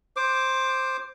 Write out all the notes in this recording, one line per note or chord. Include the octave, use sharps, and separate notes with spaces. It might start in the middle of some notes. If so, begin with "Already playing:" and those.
C5 D6